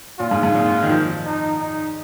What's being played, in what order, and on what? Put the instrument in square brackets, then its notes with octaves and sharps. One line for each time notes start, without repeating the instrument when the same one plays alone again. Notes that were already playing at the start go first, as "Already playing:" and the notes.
[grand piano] A#2 [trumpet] F4
[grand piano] G#2
G#2
A#2
D#3
F3
[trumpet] D#4
D#4